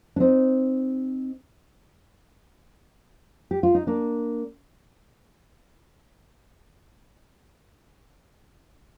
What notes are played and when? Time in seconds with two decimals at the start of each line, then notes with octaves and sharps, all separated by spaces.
0.16 D4
0.20 C4 D#4
3.51 G4
3.63 F4
3.75 D#4
3.87 A#3 D4